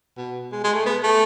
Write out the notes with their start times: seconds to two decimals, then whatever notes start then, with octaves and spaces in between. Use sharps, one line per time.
0.17 B2
0.52 G#3
0.64 G#3
0.74 A3
0.86 B3
1.03 A3